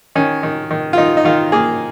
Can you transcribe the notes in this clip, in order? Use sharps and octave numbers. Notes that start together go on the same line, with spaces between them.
D#3 C#4
D#3
D#3
F4
D#3 D#4
D#4
D#3 F4
A#3 G#4